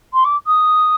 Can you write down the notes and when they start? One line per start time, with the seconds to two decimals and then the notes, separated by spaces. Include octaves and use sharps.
0.14 C6
0.25 D6
0.47 D#6